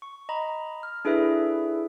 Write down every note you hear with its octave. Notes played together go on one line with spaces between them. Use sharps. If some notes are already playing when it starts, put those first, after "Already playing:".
C#6
D#5 A#5 B5
F6
D4 E4 G#4 A4 B4 E5